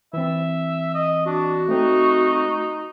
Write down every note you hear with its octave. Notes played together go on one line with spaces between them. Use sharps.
E3 C4 E5
D#5
D4 F#4
A3 C4 D#4